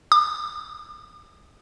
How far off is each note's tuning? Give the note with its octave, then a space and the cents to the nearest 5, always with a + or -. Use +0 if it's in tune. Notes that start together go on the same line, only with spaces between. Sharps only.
D6 +40